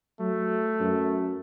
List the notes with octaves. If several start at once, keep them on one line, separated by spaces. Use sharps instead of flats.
F#3 A3
F#2